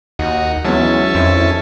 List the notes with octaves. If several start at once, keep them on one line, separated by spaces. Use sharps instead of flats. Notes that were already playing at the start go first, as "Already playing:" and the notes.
D#2 D#4 F#4
E3 F#3 G#3 B3 C#4 E5 A5
F2 D#3 C4 E4